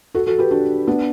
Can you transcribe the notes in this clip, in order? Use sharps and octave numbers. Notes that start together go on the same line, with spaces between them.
F#4 A4
F#4 A4
G4 B4
D4 F#4
B3 D4